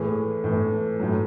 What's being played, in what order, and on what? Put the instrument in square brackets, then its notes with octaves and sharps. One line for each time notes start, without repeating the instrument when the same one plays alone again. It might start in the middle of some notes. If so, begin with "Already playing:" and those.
Already playing: [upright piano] A2 E3 G#4
A2 E3
A2 F#3